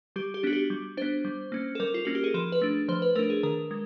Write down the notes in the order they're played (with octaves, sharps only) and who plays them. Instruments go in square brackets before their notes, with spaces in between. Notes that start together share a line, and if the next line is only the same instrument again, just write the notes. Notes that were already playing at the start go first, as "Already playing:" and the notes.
[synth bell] G3 G4
G4
B3 D4 F#4
G4
G3
B3 D4 C5
G3
A#3 C#4
A4
G3 A#4
F4
A#3 C#4 F#4
G4
G#4
F3 A4
B4
A3 D4
F3 C5
B4
A3 D4 A#4
G#4
D#3 A#4
G#3